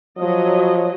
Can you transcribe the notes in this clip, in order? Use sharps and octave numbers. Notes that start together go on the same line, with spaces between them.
F3 F#3 D#5